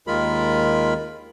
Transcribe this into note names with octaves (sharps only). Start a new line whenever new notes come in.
D#2 D#3 G#3 F4 A#4 B5